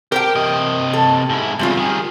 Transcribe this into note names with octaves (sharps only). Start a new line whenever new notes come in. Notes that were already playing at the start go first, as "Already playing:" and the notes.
G4 A#4 C5 G5
C3 D#5
A4
G#2 E4
E2 C#3 G3 C4 F4
D#3 G#4